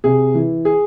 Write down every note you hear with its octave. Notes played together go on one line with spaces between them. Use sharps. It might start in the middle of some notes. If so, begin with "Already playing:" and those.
C3 G#4
E3
G#4